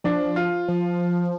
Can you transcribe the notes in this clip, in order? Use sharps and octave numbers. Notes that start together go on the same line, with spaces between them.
F3 D4
F4
F3